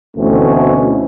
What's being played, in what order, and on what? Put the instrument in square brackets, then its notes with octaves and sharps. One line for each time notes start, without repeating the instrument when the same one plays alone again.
[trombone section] D2 B2 E3 A3 C4 C#4